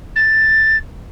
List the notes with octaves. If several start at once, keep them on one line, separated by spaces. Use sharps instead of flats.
A6